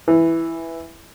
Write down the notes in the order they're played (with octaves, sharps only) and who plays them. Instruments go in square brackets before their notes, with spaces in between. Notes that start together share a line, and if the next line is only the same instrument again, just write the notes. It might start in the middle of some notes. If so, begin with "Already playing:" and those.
[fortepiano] E3